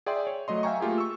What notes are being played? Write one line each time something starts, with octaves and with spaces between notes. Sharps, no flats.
G#4 D5 E5 G5 C6
C#5
F#3 A3 D#5 C6
E5 F5 G5 G#5 A#5 C#6
A3 A#3 F4 G4 G#4
C#6 E6